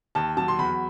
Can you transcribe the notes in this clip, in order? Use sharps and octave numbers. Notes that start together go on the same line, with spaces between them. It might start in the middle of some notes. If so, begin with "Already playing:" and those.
D#2 A5
F#3 A5
C6
E2 B5